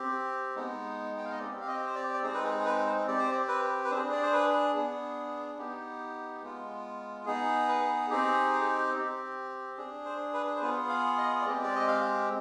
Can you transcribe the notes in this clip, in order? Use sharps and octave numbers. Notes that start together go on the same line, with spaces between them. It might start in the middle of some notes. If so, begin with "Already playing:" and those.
Already playing: C4 G4
G#3 B3 D#4
G5
F5
D#5
C4 G4 D5
F5
D#5
C5
D5
D5
G#3 C4 D#4 G#4 C5
B4
G#4
G#4
B4
C5
C4 G4 D5
C5
D5
B4
B4
D4 G#4 C5
D5
C5
B4
B3 D4 G#4
B3 D#4 G4
G#3 B3 F4
B3 D#4 G#4
B4
C4 D#4 G4 G#4
C4 G4
D4 G#4
C5
B4
C5
B3 F4 G#4 B4
F5
D#5
D5
G#3 C4 G4 D#5
D5
D#5
F5